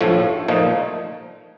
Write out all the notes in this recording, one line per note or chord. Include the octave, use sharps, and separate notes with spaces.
A#1 A2 F3 A3
A#2 F3 A3 D#4